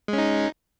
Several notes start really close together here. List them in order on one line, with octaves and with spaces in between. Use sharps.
G#3 C#4 D#4